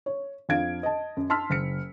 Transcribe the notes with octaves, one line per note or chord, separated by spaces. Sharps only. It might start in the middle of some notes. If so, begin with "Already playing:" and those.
C#5
F2 D4 F5 G#6 D7
D#5 A5
F#2
A5 C6 E6 F6 B6
F#1 B6 C#7